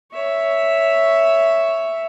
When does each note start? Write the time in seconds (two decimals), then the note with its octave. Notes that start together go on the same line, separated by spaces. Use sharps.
0.12 C#5 E5